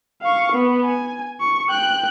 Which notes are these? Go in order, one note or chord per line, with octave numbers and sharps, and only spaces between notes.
F5 C#6
B3
G#5
C#6
G5 F#6